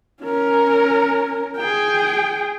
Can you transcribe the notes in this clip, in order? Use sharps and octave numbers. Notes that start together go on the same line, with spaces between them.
C#4 A#4
G#4 G5